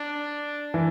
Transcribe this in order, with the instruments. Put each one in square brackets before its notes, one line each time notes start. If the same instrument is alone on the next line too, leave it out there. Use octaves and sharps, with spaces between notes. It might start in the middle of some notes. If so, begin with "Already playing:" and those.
Already playing: [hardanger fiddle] D4
[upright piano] E3